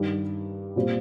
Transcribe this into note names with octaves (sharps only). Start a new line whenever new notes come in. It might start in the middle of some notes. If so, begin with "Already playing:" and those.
Already playing: G2 D#3 G3
A#2 G3 C4